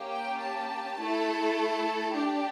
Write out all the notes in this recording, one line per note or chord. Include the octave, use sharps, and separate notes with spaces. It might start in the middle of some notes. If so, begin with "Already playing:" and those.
Already playing: A#3 C#4 G4
G5
A5
A3 E4 A4
D4 G4